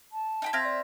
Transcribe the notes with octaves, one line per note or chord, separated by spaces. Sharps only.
A5
D#4 G5 B5
C4 E5 F5 G#6 A#6 B6
D5